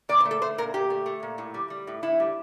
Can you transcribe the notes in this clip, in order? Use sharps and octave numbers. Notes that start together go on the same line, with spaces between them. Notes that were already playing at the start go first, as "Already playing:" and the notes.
A#2 D5
C5
A3
A4
A3 C5
A#2 A#4
A#2 G4
A3
A3
A#2
A2
G3
G3
A2
A2 E4
G3